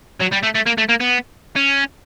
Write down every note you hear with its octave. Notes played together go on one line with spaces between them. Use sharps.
F#3
G3
A3
A3
A#3
A3
A#3
B3
C#4